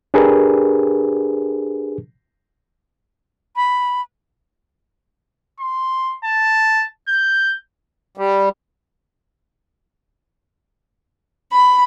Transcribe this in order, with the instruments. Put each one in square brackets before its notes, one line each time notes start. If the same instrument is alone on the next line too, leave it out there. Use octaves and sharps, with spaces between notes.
[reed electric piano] D4 G4 G#4 A#4 B4
[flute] B5
[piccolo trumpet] C6
A5
G6
[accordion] G3
[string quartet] B5